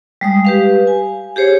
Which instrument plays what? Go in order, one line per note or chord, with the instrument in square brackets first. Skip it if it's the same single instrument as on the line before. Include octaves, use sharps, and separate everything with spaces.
[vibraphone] G3 G#3 D#6
G4 B4 F5
G#5
G4 G#4 C5 C#5